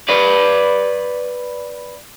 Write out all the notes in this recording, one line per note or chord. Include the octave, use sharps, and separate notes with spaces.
B4 D5